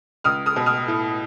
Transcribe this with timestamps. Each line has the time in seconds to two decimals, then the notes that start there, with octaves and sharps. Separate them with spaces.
0.24 C#2 D#6 F6
0.46 D#6 F6
0.56 B2
0.66 D#6 F6
0.88 A2